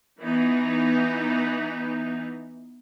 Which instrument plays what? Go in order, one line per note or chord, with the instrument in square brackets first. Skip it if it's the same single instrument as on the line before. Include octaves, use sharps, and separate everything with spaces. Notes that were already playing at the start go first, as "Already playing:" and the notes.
[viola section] E3 B3 D#4